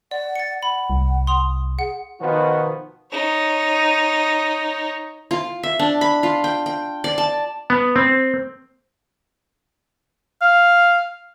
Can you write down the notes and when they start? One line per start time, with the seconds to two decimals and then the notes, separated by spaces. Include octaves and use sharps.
0.11 D5 F#5
0.35 A6 C#7
0.63 F#5 B5
0.90 C2
1.27 C6 D#6 F7
1.79 G#4 F#5
2.21 B2 D#3 F3 B3 F#4
3.12 D#4 C#5
5.31 F4
5.63 E5
5.79 D4
6.01 B5
6.23 F4
6.44 G5
6.66 G5
7.04 D5
7.18 A5
7.70 B3
7.96 C4
10.42 F5